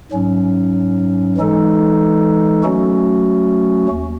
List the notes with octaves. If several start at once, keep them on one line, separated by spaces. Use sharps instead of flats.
G#2 F#3 C#4
E3 G#3 D#4 A4
F#3 A3 C#4 F#4
D#2